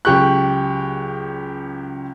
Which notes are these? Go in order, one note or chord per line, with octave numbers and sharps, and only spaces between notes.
C#2 F#3 G4 C#6 F#6